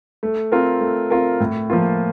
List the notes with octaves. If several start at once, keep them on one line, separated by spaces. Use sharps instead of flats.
A3
C4 F4 A#4
A3
C4 F4 A#4
A2
F3 A#3 F4